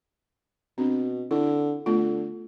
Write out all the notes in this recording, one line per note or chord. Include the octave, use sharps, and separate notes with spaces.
B2 C4 D4
D3 E4
D3 A3 B3 F4